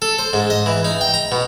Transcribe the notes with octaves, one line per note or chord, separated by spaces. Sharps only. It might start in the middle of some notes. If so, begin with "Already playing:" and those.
A4
C5
G#2
D#5
E3
D#4
G5
A#5
B2